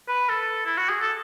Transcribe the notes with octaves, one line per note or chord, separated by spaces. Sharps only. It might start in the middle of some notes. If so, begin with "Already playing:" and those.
B4
A4
E4
F#4
G#4
A4